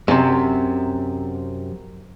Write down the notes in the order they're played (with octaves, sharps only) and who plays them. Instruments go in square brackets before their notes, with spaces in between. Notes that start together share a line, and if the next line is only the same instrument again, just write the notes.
[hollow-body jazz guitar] F#2 C3